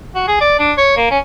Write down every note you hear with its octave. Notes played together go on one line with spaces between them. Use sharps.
F#4
G#4
D5
D4
C#5
A#3
C#4